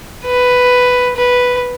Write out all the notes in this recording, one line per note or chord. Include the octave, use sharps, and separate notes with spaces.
B4
B4